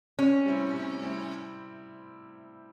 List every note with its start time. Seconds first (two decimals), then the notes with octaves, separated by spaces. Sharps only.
0.19 C3 C#4
0.46 G3 C4 E4
0.73 C3
1.01 G3 C4 E4